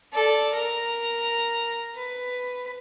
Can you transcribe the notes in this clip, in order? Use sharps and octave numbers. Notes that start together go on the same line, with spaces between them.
A4 D5
A#4 A#5
B4